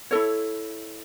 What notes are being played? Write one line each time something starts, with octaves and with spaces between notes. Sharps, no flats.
E4 A4 C#5